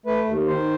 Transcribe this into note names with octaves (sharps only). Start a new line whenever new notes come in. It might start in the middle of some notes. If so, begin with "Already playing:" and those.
A3 B4
D#2
D#3 C5